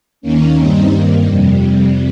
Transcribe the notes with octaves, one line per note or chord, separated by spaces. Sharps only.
D#2 D#3 A#3 C#4
G2 G3 C4 D#4
G2 D#3 A#3
F2 C3 G3